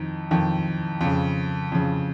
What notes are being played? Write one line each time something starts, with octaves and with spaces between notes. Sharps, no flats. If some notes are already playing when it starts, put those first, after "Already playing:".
Already playing: F2 D#3 D#4
F2 D#3
F2 C#3
F2 C#3